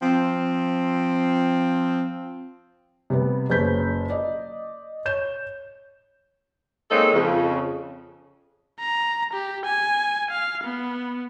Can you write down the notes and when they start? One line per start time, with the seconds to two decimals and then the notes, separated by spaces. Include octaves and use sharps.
0.01 F3 C4
3.10 C3 G3 B3 B4
3.50 F#1 C#4 B4 C5 G6 B6
4.10 D5 D#5
5.05 C#5 G6 E7
6.91 G#3 A#3 C4 C#4 D#4 A4
7.12 F2 C#3
8.80 A#5
9.33 G4
9.65 G#5
10.31 F5
10.63 B3